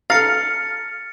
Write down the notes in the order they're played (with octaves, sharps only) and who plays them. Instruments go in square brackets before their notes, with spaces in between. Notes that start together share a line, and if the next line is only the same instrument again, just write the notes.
[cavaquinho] A4 A#5 [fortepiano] F5 [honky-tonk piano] F6 [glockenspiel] A6 C#7